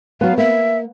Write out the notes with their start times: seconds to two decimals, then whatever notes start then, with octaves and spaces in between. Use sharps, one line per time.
0.21 F#3 B3 F5
0.38 A#3 E5